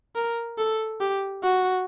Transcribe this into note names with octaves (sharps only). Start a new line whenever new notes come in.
A#4
A4
G4
F#4